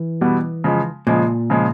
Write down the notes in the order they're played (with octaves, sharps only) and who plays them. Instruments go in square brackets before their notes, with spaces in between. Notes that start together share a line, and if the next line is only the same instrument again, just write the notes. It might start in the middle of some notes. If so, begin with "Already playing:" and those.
Already playing: [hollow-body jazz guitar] E3
[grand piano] B2 G3 B3
C#3 F3 G#3
[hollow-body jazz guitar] A#2 [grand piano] C#3 F3 G#3
[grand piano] C#3 F3 G#3